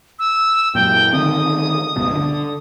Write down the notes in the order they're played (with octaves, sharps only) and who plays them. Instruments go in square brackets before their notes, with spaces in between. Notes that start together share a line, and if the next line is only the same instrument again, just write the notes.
[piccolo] E6
[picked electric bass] F#2 A#2 [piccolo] G5
[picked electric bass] D3 D#3 C4 [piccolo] D#6
[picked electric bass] C#2 G2 B2
D3